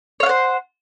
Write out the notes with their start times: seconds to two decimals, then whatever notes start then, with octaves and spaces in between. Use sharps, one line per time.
0.20 C#5
0.23 F5
0.26 F#5
0.29 C5